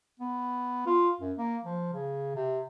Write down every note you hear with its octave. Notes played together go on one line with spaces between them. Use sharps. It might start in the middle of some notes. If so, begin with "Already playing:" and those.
B3
F4
F#2
A#3
F3
C#3
C3